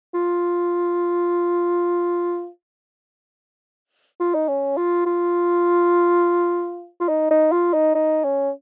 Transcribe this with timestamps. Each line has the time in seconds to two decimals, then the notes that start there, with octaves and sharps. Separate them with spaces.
0.14 F4
4.20 F4
4.34 D#4
4.48 C#4
4.77 F4
5.06 F4
7.00 F4
7.08 D#4
7.31 D#4
7.52 F4
7.73 D#4
7.95 D#4
8.24 C#4